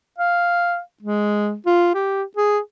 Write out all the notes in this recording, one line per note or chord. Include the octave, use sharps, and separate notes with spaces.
F5
G#3
F4
G4
G#4